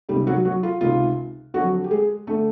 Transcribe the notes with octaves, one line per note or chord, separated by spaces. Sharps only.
C#2 C3 D#3 G3 G4
F#3 F#4
F#3 F#4
F4
C#2 C3 D#3 F4
F2 D3 F#3 F#4
G4
G#3 G#4
D3 A3 A4